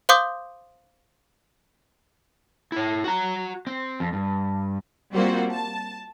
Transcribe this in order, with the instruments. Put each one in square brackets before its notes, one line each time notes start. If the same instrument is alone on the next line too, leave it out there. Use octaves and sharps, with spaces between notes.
[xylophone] C5 F5 C6 D6 D#6 G6
[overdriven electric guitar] E4 C#5
F#4 A#5
C4
F2
G2
[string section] G3 A#3 C4 F4 F#4 C5
A5